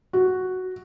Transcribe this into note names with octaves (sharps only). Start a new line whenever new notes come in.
F#4